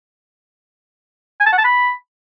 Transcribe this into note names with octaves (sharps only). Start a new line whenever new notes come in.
G#5
A5
F#5
A5
B5